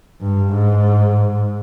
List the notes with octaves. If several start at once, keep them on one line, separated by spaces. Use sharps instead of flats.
G2
G#2